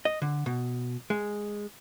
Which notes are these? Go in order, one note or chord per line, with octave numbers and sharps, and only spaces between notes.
D#5
D3
B2
G#3